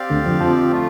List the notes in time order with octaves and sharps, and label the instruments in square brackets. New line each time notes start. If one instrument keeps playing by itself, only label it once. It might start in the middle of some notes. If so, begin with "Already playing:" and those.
Already playing: [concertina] C4 G4 D5 F5
[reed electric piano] D2 D3
F2 F3
F2 F3
[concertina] A3 F4